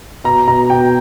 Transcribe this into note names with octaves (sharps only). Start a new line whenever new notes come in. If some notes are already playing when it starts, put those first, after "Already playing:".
B2 A#5
B2 A#5
B2 G5